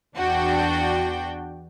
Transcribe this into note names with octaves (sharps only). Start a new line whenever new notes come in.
E2 D4 F#4 G5